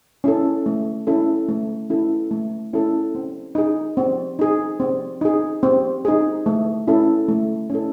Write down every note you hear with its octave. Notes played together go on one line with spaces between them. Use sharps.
C#4 E4 A4
A3
C#4 E4 A4
A3
C#4 E4 A4
A3
C#4 E4 A4
C4
D#4 G#4
C4
D#4 G#4
C4
D#4 G#4
C4
D#4 G#4
A3
C#4 E4 A4
A3
C#4 E4 A4